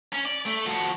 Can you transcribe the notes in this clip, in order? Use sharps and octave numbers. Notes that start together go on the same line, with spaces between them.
C#4
D5
A3
F3 F#4